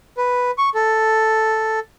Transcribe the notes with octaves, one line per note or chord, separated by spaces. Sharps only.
B4
C#6
A4